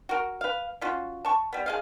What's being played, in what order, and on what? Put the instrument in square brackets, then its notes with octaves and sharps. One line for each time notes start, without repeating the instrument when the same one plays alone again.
[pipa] F#4 A#4
B4 F5
C#4 F4 F#4
A5 C#6
G3 B3
G#4 D#5 F5